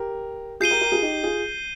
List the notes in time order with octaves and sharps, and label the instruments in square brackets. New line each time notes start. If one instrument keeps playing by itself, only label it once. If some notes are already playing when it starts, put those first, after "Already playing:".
Already playing: [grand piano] G4 A#4
[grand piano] F4 G#4 [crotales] G6 C7 D#7 G7
[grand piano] G4 A#4
G4 A#4
F4 G#4
D#4 G4
F4 G#4